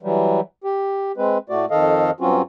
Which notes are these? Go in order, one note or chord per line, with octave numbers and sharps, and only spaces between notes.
E3 F#3 G3
G4
G#3 C4 B4
A2 A3 F#4 D5
F2 D#3 A4 D#5 F5
G2 F#3 C4 C#4 F4 F#4